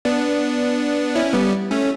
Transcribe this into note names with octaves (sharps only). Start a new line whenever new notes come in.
B3 D4
C#4 E4
G3 B3
A3 C#4